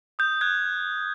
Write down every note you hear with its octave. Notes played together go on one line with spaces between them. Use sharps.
D#6 G6
F#6 G#6